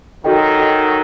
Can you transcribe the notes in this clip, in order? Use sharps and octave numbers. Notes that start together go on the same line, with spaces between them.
D#3 F#3 F#4 A4 D#5 G5
F#4 A4 D#5 G5